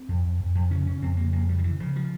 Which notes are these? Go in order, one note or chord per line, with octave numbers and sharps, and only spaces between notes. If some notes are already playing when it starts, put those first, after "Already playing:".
Already playing: C4
F2
F2
F2
F2
C#3 C#4
C#3 C#4
F2 C4
C#3 A#3
F2 A#3
C#3 G3
F3
C#3 E3
C#3 F3
F3